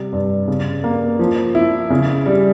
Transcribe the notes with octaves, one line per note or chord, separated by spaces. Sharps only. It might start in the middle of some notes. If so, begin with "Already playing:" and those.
Already playing: C3 G3
G2
C#3
A#3
F3
E4
C#3
G3